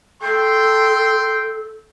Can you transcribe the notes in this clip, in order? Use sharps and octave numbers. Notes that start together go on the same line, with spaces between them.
A4 G5 C6